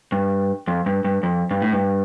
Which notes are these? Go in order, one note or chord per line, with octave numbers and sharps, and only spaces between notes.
G2
F2
G2
G2
F2
G2
A2
G2